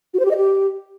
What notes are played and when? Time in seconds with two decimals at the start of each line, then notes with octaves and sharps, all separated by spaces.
0.14 F#4
0.19 C5
0.25 G4
0.31 D#5
0.36 G4